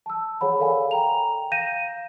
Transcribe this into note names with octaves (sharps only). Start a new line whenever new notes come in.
A5 E6
G#4 C#5 F#5 B5
A4 A#4 D5 F5 F#5 G#5
G5 A#5 F7
F5 G6 A#6 D#7 E7